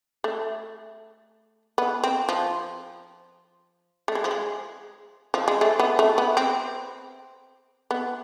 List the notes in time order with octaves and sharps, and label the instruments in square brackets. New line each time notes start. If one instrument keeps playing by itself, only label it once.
[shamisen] A3
B3
C4
F3
A3
G#3
F3
G#3
F3
G#3
A3
B3
A3
B3
C4
B3